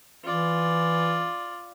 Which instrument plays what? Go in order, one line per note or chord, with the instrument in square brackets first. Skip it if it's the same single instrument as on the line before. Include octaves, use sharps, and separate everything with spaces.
[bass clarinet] E3 [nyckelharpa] F4 D5